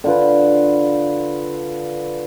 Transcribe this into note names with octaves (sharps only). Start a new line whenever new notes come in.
D3 F4 B4